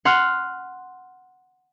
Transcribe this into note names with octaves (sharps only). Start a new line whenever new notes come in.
F#5 C6 F6